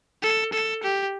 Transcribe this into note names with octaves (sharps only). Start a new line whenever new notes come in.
A4
A4
G4